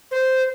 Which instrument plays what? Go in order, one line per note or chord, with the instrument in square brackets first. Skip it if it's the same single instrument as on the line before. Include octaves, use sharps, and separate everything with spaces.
[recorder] C5